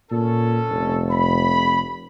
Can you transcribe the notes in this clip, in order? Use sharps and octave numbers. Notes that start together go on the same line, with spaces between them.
A#2 C#4 A4
F1
B5